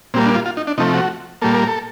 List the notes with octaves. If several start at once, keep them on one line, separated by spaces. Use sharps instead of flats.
A#2 G3 A#3 C4
D4
F4
F4
D#4
D4
C3 F3 A3 D#4
F#4
A#2 G3 A#3 A4
A#4
A4